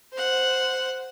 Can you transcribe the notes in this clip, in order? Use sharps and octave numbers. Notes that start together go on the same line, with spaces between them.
C5 F#5